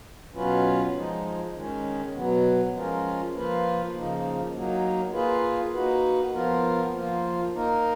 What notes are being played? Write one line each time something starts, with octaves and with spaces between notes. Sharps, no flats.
B2 F#3 C#4 F4 B4
F3 G#3 D#4
D#3 G#3 C#4
B2 F#3 B3
F3 G#3 C#4 F4 A#4
F3 A#3 F4 B4
C#3 F3 A#3 D#4
F#3 A#3 D#4
A#3 F4 G#4 B4
A#3 D#4 F#4 B4
F3 B3 F4 A#4
F3 A#3 F4
A#3 D#4 A#4